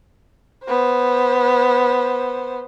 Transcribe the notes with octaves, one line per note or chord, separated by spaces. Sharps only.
B3 C5